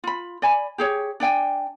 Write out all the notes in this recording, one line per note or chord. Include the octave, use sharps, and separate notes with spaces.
F4 B5
D5 G#5 B5
G4 G#4 C#5
D4 D5 G5 G#5